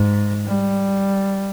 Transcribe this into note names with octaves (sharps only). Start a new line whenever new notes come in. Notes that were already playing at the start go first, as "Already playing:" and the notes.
Already playing: G#2
G3